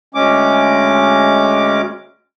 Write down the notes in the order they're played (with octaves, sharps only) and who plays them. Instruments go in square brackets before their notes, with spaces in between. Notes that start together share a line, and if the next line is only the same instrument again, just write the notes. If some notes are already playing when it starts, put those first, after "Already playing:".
[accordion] D2 G#3 C#4 D6